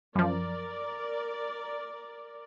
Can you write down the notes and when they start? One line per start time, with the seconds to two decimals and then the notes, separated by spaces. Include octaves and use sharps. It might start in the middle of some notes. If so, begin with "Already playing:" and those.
0.15 F#2 F3 A#4 D5